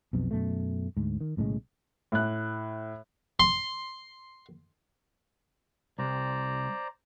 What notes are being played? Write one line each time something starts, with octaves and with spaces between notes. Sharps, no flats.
B1 F2 B2
F#2 B2 A3
D2 G#2
D#3
B1 A2 C#3 G#3
A2 F#6
C6
C2 C5 D5 A#5